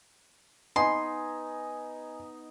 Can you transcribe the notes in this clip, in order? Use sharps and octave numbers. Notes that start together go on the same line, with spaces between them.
B3 D#4 D#5 G#5 C6